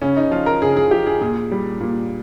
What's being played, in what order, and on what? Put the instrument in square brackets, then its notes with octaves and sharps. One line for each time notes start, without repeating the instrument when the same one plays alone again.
[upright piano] C#3 C#4
D#4
F3 F4
A#4
C#3 G#4
G#4
F3 G4
G#4
A#2 G#4
G3
A#2